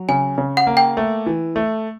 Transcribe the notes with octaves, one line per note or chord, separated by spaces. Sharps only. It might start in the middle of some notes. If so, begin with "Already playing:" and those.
Already playing: F#3
C#3 G#5
C#3
F#5
A#3
G5
A3
E3
A3